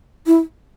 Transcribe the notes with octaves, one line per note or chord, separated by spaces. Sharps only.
E4